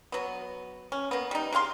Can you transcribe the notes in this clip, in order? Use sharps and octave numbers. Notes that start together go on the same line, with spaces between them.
F#3 B3
C#4
A#3 B3
G3 D#4
C3 G#4 F5 C6